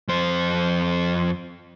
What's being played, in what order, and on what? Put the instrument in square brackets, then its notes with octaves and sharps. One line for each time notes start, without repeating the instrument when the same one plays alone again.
[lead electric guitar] F2 C5